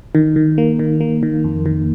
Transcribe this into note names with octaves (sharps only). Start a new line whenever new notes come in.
D#3
D#3
A#3
D#3
A#3
D#3
F2
D#3